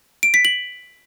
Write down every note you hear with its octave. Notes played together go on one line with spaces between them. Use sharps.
D7
B6
F#7